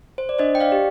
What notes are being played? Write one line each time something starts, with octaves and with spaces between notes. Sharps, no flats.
C5
D5
D4 C5 D#5
G5
D5 F5
G4